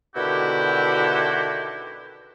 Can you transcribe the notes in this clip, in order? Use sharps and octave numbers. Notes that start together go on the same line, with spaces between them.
B2 D3 D#3 E4 F#4 G4